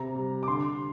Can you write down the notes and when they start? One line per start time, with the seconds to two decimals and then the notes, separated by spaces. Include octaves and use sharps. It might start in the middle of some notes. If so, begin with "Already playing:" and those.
Already playing: C3 A#5
0.15 G3
0.43 D6
0.47 D3 C6